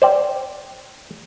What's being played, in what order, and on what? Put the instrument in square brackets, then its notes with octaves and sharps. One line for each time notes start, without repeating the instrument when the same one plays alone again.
[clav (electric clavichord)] C5 D5 G5